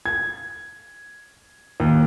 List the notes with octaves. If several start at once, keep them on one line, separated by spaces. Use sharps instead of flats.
G#6
D#2